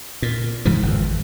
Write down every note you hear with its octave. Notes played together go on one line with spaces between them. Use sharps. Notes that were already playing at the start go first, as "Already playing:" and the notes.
A#2
G#2 C#3 E3 F3
G#1 F2